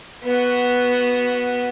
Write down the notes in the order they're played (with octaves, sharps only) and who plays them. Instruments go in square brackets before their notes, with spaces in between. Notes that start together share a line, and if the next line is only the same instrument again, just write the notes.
[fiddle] B3 F#4